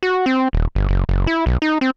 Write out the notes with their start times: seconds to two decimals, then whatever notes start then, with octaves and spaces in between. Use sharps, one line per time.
0.03 F#4
0.26 C4
0.53 D#1
0.75 G1
0.89 F#1
1.09 F#1
1.27 E4
1.46 B1
1.62 D#4
1.81 C4